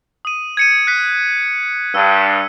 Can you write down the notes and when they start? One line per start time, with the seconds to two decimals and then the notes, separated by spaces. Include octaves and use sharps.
0.25 D#6 D#7
0.57 G#6 C#7 D#7
0.87 F#6 B6
1.95 G2 E6